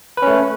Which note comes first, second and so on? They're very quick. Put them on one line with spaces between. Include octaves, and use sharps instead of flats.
B4 C#4 A3